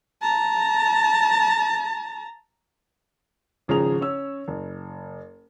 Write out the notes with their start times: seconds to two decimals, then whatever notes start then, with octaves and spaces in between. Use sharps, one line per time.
0.22 A5 A#5
3.68 G#1 C#3 F3 G#4 A#5 F7
4.01 C#4 C#5 E6
4.48 F#1